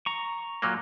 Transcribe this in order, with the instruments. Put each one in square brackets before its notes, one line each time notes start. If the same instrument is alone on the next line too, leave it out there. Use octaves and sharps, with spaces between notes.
[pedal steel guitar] A#5 C#6
[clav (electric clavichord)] A#2 F#3 A#3